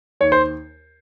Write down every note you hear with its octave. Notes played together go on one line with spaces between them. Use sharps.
D#2 C#5
C5